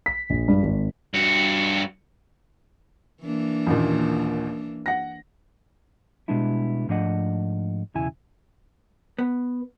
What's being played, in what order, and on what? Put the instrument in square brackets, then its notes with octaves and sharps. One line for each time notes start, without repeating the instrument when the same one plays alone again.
[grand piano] B6
A#1
G2
G#1
[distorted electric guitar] G2 F#4
[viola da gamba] E3 A#3 D4
[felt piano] A1 D#2 A#2
F#5 A#6
[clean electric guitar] B2 G3 G#3 B3 D4 E4
G#2 F3 A3 D4 D#5 F#5
B1 E2 C#3 E4 G#5
[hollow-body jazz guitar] B3